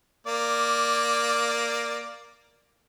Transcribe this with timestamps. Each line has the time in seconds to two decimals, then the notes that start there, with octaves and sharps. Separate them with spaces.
0.27 A#3 D5